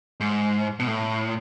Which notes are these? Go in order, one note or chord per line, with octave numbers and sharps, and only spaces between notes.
G#2
B2
A2